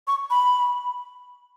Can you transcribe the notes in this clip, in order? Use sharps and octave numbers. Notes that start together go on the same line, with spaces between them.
C#6
B5